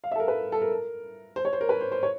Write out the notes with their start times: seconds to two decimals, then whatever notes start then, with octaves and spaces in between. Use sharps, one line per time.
0.04 F5
0.12 E5
0.15 A4
0.20 A#4
0.28 B4
0.52 A4
0.62 A#4
1.36 C5
1.45 C#5
1.53 C5
1.61 A#4
1.69 B4
1.81 C5
1.92 C5
2.03 C#5